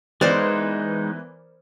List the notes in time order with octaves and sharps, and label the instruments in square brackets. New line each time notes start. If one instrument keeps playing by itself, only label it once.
[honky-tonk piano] E3 B3 [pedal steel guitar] G#3 D#4 [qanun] A#4 C5 D5